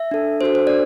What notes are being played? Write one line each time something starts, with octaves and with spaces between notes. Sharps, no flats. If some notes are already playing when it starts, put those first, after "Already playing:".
Already playing: E5
D4 A4
D4 F#4 A4 C5
C5
D4 D5